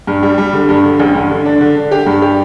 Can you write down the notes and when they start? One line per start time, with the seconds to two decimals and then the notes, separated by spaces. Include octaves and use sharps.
0.07 G2
0.23 G3
0.38 G3
0.53 D3
0.69 G2
0.84 D3
0.99 A1
1.15 G2
1.30 D3
1.45 D4
1.61 D3
1.76 D3
1.91 G4
2.06 G2
2.22 G4